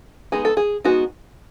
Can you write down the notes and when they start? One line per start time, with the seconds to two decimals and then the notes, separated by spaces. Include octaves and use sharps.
0.32 G#3 B3 D#4 G#4
0.45 A4
0.57 G#4
0.84 G#3 B3 D#4 F#4